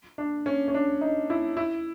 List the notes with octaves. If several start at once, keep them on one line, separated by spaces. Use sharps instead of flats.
D4
C#4
C#4
D4
D#4
E4
E4